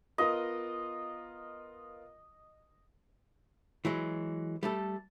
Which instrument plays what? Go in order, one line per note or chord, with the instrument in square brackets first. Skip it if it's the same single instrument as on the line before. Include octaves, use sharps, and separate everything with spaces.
[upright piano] B3 F4 A#4 [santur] D#5
[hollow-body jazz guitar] E3 F#3 G#3
G3 A3 A4